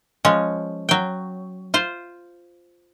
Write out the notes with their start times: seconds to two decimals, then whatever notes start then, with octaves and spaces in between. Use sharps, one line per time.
0.25 F3 G#3 C#4
0.89 F#3 G5
1.74 F4 C5